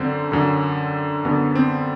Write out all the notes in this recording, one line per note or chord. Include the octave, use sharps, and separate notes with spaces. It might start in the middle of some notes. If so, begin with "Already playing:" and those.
Already playing: F#2 D3 C4
F#2 D3
F#2 D3 B3
C4